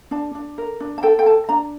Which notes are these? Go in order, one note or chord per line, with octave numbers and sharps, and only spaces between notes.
D4 A5
D4
A#4
D4
A5
A4 G5
G5
A4 A5
D4 A#5